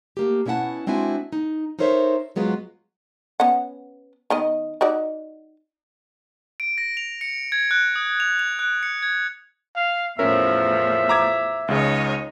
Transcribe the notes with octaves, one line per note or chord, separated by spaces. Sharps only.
A3 A#3 G4
B2 C#4 E4 E5 F#5 A5
G#3 C4 D4 E4 F#4 G#5
D#4
D#4 A4 A#4 C5 C#5 E5
G#2 F#3 G#3 B3 F4
B3 C#4 F#5
D#3 B3 D#5
D#4 F#4 D5
D7
A#6
F7
C#7
G#6
F#6
D#6
F7
F7
F#6
C#7
G#6
F5
E2 A2 F3 C#4 A#4 E5
A#5 D6 G#6
C#2 C#3 D#4 C#5